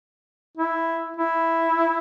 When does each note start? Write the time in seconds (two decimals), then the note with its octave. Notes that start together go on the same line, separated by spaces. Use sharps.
0.57 E4
1.16 E4